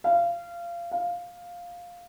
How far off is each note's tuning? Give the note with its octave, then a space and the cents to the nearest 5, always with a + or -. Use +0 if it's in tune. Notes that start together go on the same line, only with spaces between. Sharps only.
F5 -25
F5 +5